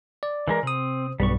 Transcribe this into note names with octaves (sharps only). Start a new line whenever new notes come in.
D5
E3 G#3 A#4
C3 C4 D#6
B1 G2 G3 B3 C#6